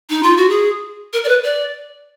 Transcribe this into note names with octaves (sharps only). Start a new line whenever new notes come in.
D#4
F4
F#4
G#4
A#4
D5
B4
D5